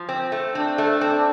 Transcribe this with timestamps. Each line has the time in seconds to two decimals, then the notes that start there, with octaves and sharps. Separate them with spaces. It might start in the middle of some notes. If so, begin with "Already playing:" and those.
Already playing: F3
0.09 C4
0.32 A3
0.55 C4 D4
0.78 A3
1.01 C4